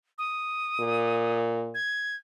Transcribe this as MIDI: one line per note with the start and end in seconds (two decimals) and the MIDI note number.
0.18 1.39 87
0.80 1.74 46
1.75 2.16 92